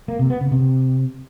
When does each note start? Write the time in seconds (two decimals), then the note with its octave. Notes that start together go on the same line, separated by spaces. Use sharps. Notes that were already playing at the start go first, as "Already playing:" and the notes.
0.08 A#3
0.19 C3
0.30 B3
0.41 C#3
0.52 C3